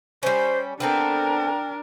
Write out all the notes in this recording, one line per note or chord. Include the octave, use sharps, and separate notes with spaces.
G3 C#4 C5
B3 C4 D4 A4 A#4 G5